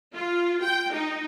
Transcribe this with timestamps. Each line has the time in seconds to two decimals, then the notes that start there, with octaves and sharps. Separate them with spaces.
0.15 F4
0.63 G5
0.93 D#4